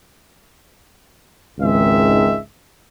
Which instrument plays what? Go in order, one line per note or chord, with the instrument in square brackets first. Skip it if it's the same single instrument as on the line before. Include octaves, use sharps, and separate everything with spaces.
[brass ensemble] G#1 C#2 D#3 G#3 E5